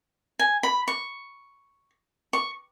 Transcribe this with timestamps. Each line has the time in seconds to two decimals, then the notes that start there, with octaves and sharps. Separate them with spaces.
0.39 G#5
0.63 B5
0.88 C#6
2.33 C#6